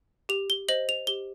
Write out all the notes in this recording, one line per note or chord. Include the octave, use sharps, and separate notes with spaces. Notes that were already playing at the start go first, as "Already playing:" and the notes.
G4 F7
G7
C5 D#5 F#7
F7
G4 G7